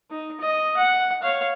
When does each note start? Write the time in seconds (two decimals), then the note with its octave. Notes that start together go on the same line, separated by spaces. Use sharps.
0.10 D#4
0.40 D#5
0.77 F#5
1.23 C#5 F5